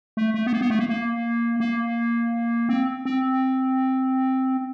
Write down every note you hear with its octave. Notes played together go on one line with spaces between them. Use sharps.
A3
A3
B3
A#3
B3
A3
A#3
A#3
A#3
C4
C4